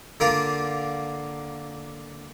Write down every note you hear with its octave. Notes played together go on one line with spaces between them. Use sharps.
D3 A#3 D4 F4